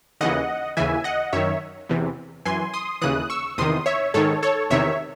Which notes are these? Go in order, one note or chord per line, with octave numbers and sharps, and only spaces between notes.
D#2 C#3 E3 D#5 F#5
D#2 C#3 E3 E5 G#5
D#5 F#5
F#2 D#3 C#5 E5
E2 C3 E3
F#2 E3 G#5 C6
C6 D#6
D#2 C#3 E3 D#6 F#6
C#6 E6
E2 C3 D#3 C6 D#6
C#5 E5
G#2 D#3 A4 C#5
A4 C#5
E2 C3 D#3 C#5 E5